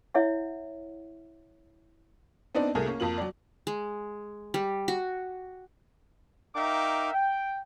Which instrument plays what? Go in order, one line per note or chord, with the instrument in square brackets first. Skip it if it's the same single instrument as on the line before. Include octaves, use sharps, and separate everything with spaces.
[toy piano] E4 C#5 E5 F#5
[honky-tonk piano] B3 C4 D4 D#4 D5
C2 A3 G#4 A#4
A#3 C#4
F2 A#3 F4 F#7
F#3 D5
[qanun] G#3
G3
F#4
[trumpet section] D#4 A#4 E5 F5 G5 D6
G5